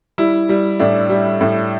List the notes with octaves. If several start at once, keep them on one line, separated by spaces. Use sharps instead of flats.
G3 E4
G3
A2 D4
G3
A2